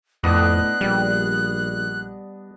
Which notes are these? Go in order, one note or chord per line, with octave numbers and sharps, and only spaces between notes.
F2 A2 B3 D4 D#5 F#6
A#1 G3